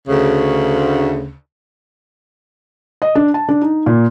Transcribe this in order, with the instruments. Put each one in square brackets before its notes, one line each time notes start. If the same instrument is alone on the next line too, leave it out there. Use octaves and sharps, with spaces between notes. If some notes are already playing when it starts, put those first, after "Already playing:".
[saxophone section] D2 C#3
[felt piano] D#5
D4
A5
D4
D#4
A#2